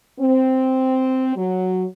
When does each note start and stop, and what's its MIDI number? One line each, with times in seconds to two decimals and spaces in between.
0.20 1.33 60
1.36 1.84 54